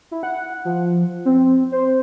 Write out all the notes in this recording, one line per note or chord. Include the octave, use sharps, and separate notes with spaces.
E4
F#5
F3
C4
C5